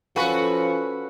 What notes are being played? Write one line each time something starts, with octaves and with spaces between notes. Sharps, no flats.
F3 C#4 F#4 A4 B4 F5 G#5 C#6